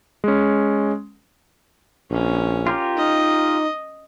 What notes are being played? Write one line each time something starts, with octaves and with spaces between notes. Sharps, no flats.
G#3 C#4
A#1 C#4
F4 G4 A#4
D#4 D#5